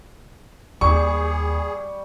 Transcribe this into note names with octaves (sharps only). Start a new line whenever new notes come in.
D#2 G3 G#4 C#6